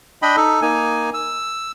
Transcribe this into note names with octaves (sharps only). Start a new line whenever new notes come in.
D4 D#5 G5 B5
D#4 A4
A#3 D#4 G#5
E6